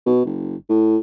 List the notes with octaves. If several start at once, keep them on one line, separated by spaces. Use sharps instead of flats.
B2
F#1
A2